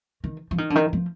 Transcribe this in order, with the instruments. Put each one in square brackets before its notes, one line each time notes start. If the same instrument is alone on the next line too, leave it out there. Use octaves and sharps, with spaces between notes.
[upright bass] D#3
F3
D#3
D3
D#3
F3